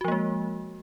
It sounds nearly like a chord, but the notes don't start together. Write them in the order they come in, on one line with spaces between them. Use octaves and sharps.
F#4 F3 A#3 G#3